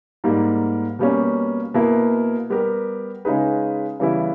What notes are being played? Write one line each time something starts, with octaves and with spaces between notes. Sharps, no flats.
G#2 G3 A#3
B2 G3 A#3 C#4
B2 A#3 E4 A#4
G3 B3 G4 A#4
C#3 G#3 D#4 G#4 B4
C#3 E3 G3 B3 E4